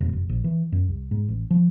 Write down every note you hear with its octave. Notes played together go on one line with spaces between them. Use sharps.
E1
F#1
A#1
E3
F#2
C2
G#2
A1
F3